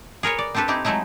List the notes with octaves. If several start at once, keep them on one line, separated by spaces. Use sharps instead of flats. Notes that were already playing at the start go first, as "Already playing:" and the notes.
G#4 A#4 B4 C#5
D5
C4 D4 G4 A4 B4
C4 D#4 E4 G4
F#3 G#3 A3 D#4 E4